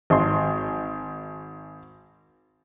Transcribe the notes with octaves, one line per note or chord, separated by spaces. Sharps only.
G#1 C6